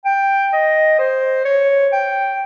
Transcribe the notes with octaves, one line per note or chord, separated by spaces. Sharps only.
G5
D#5
C5
C#5
G5